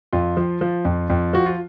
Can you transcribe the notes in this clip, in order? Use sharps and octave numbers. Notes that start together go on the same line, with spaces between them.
F2 F4
F3
F3
F2
F2
F3 F#4
F4